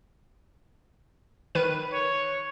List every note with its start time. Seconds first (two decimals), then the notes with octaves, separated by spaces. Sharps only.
1.55 D#3 B4 D#7
1.93 C#5